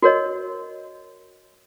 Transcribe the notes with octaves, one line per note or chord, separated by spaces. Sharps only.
F#4 A#4 C#5 D#5